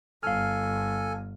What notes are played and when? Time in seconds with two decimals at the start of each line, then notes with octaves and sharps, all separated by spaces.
0.23 G1 A4 F5 G#5 F6